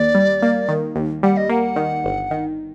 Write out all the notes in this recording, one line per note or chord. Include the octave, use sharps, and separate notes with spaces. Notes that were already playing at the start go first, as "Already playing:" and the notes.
Already playing: D#2 D5
G3
A#3
D#3
D#2
G3 F#5
D#5
A#3 F#5
D#3
G1
D#3